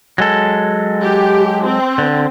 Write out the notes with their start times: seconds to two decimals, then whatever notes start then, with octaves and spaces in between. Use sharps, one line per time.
0.18 F#3 G#3 A4
1.01 G4
1.66 C4
1.98 D3